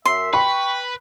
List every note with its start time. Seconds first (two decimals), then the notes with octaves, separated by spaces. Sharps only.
0.05 F#2 E5 C6
0.34 B4 G5 B5 C#6